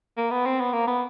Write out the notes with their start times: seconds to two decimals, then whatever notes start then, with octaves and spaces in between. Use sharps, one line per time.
0.17 A#3
0.31 B3
0.45 C4
0.60 B3
0.73 A#3
0.87 B3